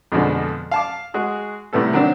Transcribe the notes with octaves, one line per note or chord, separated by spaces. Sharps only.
F2 B2 D3 F3 G#3 D4
F5 A5 D6
G#3 F#4 G#4 F#6
A2 C3 G3 B3 A4
D#3 F#3 C4 D4 C5